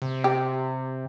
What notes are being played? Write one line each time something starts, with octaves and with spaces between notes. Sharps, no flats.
C3
G4